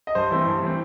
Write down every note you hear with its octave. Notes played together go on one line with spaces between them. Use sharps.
D#5
G2 C5
E3 A3 C4
G2
E3 A3 C4